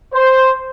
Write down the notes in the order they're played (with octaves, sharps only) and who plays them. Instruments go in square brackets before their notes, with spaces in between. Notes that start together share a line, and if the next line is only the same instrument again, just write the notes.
[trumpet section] C5